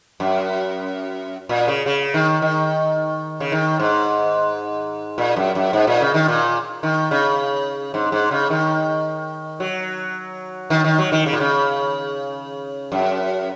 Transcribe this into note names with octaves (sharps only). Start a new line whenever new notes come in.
F#2
A#2
C#3
C#3
D#3
D#3
C#3
D#3
G#2
A#2
F#2
F#2
G#2
A#2
C#3
D#3
A#2
D#3
C#3
G#2
G#2
C#3
D#3
F#3
D#3
D#3
F#3
D#3
C#3
A#2
C#3
F#2